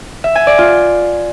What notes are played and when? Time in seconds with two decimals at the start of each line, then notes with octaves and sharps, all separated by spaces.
0.24 E5
0.35 G#5
0.47 D5
0.58 F4